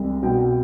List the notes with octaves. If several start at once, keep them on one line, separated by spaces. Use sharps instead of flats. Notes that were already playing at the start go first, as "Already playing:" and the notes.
Already playing: C2 G#3
B2 G5